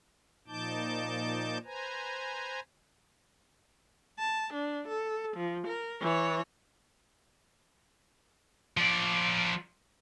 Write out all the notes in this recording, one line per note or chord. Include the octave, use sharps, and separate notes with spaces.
A#2 F3 D#4 A5 D6 G6
B4 C5 G#5 A#5
A5
D4
A4
F3
A#4
E3 C#5
F3 D5